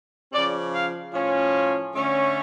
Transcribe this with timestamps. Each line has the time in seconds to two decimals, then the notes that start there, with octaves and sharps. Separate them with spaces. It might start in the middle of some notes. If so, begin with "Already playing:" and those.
0.33 C#3 F3 C#4 D5
0.74 F5
1.14 A2 F3 C#4
1.95 D3 A3 C#4